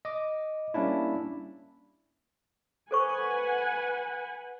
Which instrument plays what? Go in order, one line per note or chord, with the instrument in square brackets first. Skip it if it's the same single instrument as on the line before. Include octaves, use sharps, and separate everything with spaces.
[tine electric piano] D#5 D6
G3 A#3 C#4 D4 E4
[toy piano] A4 C5 C#6 [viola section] B4 F#5 G#5